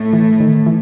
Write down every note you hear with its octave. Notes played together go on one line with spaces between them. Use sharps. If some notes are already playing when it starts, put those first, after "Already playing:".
Already playing: A2 A3
E3
D#3
E3